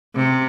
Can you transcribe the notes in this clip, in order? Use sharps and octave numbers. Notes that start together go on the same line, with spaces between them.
C3